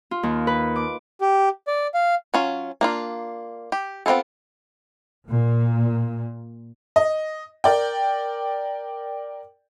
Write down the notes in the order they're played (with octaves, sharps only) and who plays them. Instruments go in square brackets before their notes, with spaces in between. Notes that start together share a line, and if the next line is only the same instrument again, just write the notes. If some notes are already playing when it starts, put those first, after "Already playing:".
[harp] F4
D#2
B4
D6
[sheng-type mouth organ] G4
D5
F5
[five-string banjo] F#3 C#4 F4
A#3 D4 F4
G4
B3 C4 F4 G#4 A4
[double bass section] A#2
[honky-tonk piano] D#5
A#4 D5 G5